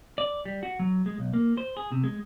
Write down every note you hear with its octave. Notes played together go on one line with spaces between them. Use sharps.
D5
G3
F#4
F#3
G#3
B1
A#3
C5
G#4
C3
G#3